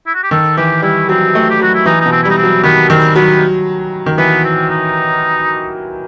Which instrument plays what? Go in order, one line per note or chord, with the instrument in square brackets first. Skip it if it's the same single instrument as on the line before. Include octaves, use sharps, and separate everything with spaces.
[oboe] E4
F#4
G4
[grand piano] D#3 [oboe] A4
[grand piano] E3 [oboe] G4
[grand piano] G3 [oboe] E4
[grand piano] F#3 [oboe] C4
[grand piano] A3
[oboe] G4
[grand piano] F#3 [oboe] F#4
[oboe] E4
[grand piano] E3 [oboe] D#4
[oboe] D#4
[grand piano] B2
[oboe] C4
E4
[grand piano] G3 [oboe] D#4
[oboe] C4
[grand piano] F#3
[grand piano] D#3 [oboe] B3
[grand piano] D#3 [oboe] C4
[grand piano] F#3 [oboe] B3
[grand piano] D#3
[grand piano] E3 [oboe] B3
[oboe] C4
D#4